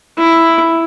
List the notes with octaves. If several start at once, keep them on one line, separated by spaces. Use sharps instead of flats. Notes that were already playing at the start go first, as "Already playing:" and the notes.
E4